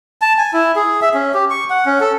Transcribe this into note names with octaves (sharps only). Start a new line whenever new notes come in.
A5
G#5
E4
G#4
E5
C#4
G4
C#6
F#5
C#4
A4